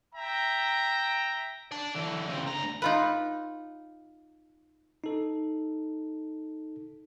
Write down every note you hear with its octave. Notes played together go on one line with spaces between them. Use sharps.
E5 G5 A#5
D5 A5
D3 E3
C#3 C4
D2 A#5
D#4 F4 B4
D#4 A4